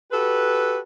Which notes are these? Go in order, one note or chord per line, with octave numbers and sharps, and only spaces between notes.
F#4 G4 A4 B4